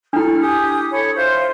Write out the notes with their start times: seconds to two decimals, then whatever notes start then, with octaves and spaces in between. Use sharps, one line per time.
0.13 D4 E4 A4 F6
0.39 G4 G#5 D#6
0.92 A4 C#5 B5
1.15 F4 C5 E5